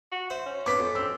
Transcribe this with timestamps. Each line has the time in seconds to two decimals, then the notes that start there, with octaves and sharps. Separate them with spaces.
0.11 F#4
0.30 C5 E5
0.46 C#4
0.66 B3 C4 D6 B6
0.79 F2
0.95 C4 E6